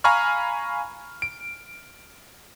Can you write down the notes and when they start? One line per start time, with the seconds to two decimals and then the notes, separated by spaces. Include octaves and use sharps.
0.04 F5 G#5 A#5 B5 C#6 F6
1.22 D7